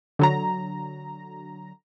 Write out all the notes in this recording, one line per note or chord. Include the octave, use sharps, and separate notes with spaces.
D3 F#3 A#5